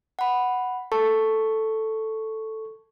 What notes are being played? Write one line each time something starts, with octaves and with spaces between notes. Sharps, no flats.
F#5 B5
A4 C#6